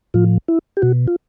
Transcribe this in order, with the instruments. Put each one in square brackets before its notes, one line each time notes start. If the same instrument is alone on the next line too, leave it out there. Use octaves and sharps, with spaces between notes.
[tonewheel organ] A2 F3 F4
E4
G4
B2 F#4
F4